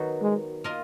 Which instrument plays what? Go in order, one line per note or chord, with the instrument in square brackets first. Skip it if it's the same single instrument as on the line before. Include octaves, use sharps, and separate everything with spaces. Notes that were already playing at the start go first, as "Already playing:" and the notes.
Already playing: [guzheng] D#3 F#3 B3 D#4 F#4
[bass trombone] G#3
[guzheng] A#3 F4 A#4 D#5